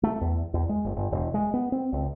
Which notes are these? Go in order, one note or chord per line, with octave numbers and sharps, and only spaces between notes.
A3
E2
E2
G#3
G1
G1
E1
G#3
B3
C4
C#2